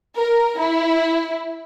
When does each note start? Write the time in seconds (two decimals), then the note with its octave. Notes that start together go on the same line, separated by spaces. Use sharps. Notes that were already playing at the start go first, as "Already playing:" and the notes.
0.18 A#4
0.59 E4